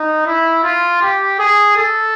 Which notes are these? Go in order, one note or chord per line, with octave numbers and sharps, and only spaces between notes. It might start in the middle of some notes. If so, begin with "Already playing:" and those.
Already playing: D#4
E4
F4
G4
G#4
A4